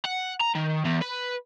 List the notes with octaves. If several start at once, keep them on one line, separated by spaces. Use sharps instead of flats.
F#5
A#5
D#3
E2
B4